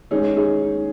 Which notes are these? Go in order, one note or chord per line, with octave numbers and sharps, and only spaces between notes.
D#3 G#3 C#4 D#4 G#4
D#4 G#4
D#4